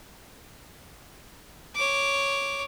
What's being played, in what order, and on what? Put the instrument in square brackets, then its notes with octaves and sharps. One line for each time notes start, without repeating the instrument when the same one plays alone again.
[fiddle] C#5 D6